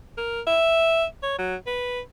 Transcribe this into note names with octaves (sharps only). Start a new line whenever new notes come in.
A#4
E5
C#5
F#3
B4